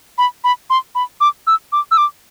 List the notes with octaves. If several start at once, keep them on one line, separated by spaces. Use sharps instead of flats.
B5
B5
C6
B5
D6
E6
D6
E6
D6